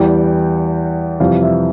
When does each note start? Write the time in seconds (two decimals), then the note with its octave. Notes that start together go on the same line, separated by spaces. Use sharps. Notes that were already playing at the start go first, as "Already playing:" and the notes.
Already playing: E2 E3 G3 G5
1.20 F2 C3 E3 G3 F5
1.43 E5